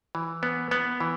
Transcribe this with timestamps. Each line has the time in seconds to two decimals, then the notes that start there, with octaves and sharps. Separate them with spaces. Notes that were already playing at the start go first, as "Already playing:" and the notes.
0.15 E3
0.43 B3
0.71 B3
1.00 E3